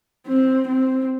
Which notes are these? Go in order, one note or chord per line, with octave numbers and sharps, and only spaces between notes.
C4
C4